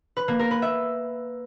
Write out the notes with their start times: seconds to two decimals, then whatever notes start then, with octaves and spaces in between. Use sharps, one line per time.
0.17 B4
0.28 A#3
0.39 A#4
0.51 B4
0.62 E5